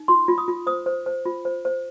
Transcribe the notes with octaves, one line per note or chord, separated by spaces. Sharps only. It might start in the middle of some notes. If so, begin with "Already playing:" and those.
Already playing: D#4
F4 C6
F4
D#6
F4
C5 D#6
C5
C5
F4
C5
C5